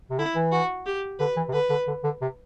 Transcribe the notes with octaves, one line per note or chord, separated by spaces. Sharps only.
C3
D3 E4
E3
F#4
G4
D3 B4
E3
C3
D3 B4
D3
D3
D3
C3